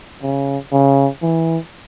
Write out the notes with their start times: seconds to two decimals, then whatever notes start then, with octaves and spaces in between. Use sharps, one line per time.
0.22 C#3
0.72 C#3
1.22 E3